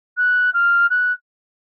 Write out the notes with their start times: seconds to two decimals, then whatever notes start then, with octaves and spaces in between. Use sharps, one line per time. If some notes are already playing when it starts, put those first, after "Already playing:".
0.17 F#6
0.53 F6
0.90 F#6